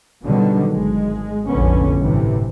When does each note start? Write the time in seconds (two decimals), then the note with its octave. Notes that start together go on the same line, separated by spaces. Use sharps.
0.23 B2 D3 D#3 F#3 G3
0.73 G#1 G#3
1.49 F1 A#1 A2 D3 B3 C#4
1.99 G1 A2 C3 E3